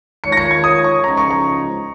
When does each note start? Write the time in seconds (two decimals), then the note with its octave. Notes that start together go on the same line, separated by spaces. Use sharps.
0.24 D#3 G#3 F4 C#5 C#7
0.32 A#6
0.37 C#7
0.51 G#6
0.64 D#6
0.84 C#6
1.03 C#2 C#3 F3 G#3 D#4 A#5
1.17 C#6
1.31 A#5